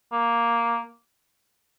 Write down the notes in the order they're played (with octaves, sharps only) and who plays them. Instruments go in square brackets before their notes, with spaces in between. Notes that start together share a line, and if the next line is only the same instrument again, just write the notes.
[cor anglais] A#3